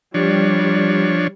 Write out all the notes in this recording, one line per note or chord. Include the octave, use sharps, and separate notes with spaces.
F3 G3 D4 C#5